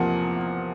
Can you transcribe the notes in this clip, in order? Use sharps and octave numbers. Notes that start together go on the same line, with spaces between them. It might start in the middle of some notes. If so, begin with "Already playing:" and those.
Already playing: E2 C3 F3 A#3 F#5